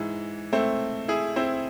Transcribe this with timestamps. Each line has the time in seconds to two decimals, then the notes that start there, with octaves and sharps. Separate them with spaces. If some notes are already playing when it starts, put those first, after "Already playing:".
Already playing: G#2 E3
0.53 A3 C4
1.08 E4 G#4
1.36 C4 E4